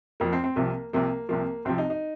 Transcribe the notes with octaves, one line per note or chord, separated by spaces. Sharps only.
F2 F3 A#3
C4
C4
C2 C3 F3 A#3
C2 C3 F3 A#3
C2 C3 F3 A#3
C2 C3 F3 C4
D#4
D#4